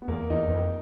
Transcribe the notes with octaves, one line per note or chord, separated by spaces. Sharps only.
B3
E2 A#3
E2 D#4
E2
F2